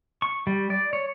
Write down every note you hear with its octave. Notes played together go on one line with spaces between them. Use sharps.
C#6
G3
D5
C#5